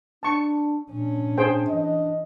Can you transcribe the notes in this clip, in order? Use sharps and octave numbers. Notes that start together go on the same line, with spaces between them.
D4 A5 C#6
A#2 C#4 D4
G#4 C5 G5
E3 D#5